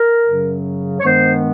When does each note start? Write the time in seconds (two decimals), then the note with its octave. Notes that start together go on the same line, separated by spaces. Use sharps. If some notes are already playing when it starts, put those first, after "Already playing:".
Already playing: A#4
0.23 F#2 C#3 F#3
1.00 C#5
1.04 G2 D#3 G#3 B3 C5